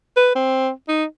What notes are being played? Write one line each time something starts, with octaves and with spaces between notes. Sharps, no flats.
B4
C4
D#4